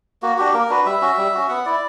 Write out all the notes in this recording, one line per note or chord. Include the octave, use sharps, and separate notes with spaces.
A#3 F#4
D4 F#4 G4
A#3 A#4
D4 F#4 B4
G3 E5
C#4 F#4
G3
C#4 F#4
B3 F#5
E4 D5